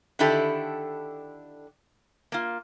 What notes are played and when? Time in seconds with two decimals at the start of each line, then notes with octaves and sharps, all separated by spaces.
0.19 D3 D#3 D4 E4 G4 A4
2.32 A#3 F4